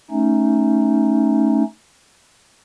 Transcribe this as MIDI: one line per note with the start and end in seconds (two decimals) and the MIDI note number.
0.11 1.63 57
0.11 1.63 61
0.11 1.63 63